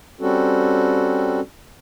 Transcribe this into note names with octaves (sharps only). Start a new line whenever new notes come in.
G3 C4 C#4 F#4 A4